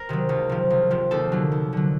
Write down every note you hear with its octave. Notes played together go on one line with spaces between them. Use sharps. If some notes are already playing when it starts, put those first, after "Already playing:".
Already playing: A#4
C3 D#3 F#3
C#2
C3 F3
C#2
C3 F3
D#2 A4
D3 F#3
D#2
D3 F#3